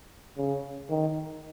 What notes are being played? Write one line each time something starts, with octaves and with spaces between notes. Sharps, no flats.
C#3
D#3